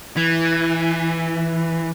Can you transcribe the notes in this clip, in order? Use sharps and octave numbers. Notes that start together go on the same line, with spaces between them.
E3